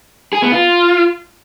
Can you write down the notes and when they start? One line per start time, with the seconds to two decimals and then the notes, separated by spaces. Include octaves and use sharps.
0.33 G#4
0.42 B3
0.52 F4